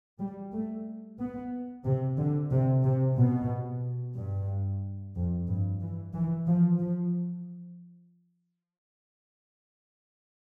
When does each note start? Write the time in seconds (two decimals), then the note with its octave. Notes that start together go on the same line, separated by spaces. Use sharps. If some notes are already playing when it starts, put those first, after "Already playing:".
0.20 G3
0.53 A3
1.19 B3
1.85 C3
2.17 D3
2.52 C3
2.84 C3
3.17 B2
4.15 G2
5.16 F2
5.48 G2
5.81 E3
6.14 E3
6.47 F3
6.80 F3